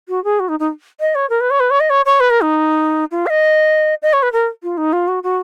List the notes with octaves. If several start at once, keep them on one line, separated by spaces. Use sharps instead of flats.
F#4
G#4
F#4
D#4
D#4
D#5
C#5
A#4
B4
C#5
B4
C#5
D#5
C#5
C#5
B4
A#4
D#4
F4
F5
D#5
D#5
C#5
B4
A#4
F4
D#4
F4
F#4
F#4